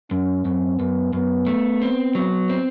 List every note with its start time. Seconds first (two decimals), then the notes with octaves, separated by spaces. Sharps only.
0.11 F#2 C#4
0.45 F#2 C4
0.79 F#2 B3
1.13 F#2 B3
1.47 A3
1.82 C4
2.15 F#3
2.49 C4